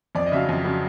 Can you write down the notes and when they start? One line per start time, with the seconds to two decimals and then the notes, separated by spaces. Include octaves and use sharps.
0.15 F2 D5
0.26 D#5
0.32 C#3 F#3 E5 F5
0.49 F2
0.64 C#3 F#3